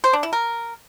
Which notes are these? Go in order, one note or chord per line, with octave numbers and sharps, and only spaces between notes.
C5
D4
E4
A#4